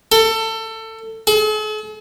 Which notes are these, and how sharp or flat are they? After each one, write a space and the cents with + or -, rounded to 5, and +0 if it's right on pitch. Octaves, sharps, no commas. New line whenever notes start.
A4 +25
A4 -45